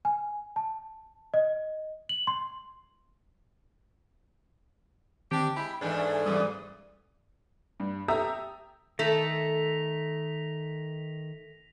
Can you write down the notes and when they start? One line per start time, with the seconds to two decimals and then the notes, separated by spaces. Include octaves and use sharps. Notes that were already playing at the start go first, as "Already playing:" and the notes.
0.05 G#5
0.56 A5
1.34 D#5
2.09 F#7
2.27 C6
5.31 D3 D#3 C4 D4 G4
5.56 G#3 E4 G4 B5
5.81 G#2 E3 A3 D4 G#5
6.26 F2 A#2 E3 G3 D#6
7.80 G2
8.08 G4 A4 E5 A#5 D#6 E6
8.99 D#3 A3 A4 A#6 B6 F7